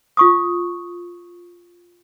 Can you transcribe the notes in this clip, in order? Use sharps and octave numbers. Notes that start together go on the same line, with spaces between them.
F4 C#6 D#6